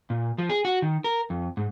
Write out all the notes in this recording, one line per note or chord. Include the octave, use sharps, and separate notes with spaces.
A#2
F3
G#4
F#4
D#3
A#4
F2
G#2